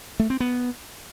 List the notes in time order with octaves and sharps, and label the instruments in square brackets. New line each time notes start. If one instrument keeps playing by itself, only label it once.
[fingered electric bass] A3
C4
B3